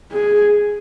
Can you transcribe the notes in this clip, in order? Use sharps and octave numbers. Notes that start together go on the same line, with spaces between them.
G#4